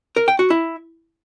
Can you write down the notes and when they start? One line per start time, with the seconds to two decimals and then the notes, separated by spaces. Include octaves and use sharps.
0.16 A#4
0.28 G5
0.39 F#4
0.50 E4